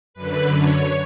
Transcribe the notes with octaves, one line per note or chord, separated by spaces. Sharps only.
F#2 D3 B4
C#5